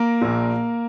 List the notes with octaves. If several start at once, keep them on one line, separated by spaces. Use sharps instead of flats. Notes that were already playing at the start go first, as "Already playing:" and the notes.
Already playing: A#3 A#4
A#1 A#2